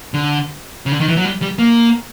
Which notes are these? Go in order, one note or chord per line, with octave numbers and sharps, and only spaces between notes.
D3
C#3
D3
D#3
E3
F#3
G3
G3
A#3